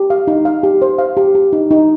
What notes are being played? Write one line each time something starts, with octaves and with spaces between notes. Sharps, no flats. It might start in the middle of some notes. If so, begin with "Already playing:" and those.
Already playing: G4
F5
D#4
F5
G4
C5
F5
G4
G4
D#4
D#4